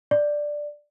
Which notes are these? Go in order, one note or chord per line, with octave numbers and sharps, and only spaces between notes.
D5